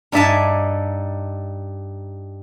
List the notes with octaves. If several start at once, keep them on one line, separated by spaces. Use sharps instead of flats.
G2 D#4 D5 E5 G#5 A5